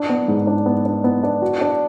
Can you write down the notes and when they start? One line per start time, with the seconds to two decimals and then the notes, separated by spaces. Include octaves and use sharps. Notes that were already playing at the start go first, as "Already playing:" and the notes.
Already playing: D4
0.09 B3
0.28 G#2
0.47 D4
0.66 B3
0.85 D4
1.04 B3
1.23 D4
1.42 F#4
1.61 D4